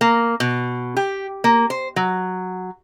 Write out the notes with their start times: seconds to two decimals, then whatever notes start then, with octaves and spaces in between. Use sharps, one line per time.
0.01 A#3
0.40 B2
0.97 G4
1.44 A#3
1.70 C5
1.96 F#3